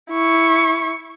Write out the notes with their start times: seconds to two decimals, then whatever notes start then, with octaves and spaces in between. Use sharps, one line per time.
0.11 E4 C#6